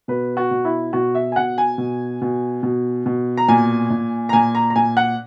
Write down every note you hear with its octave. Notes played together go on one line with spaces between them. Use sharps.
B2 B4
F#4
B2
E4
B2 F#4
E5
G#5
B2 F#5
G#5
B2
B2
B2
B2
A#5
A#2 G#5
A#2
A#5
A#2 G#5
A#5
A#5
A#2 G#5
F#5